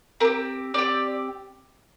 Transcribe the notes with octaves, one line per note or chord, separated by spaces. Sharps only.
C4 G4 A#4
C4 G4 D5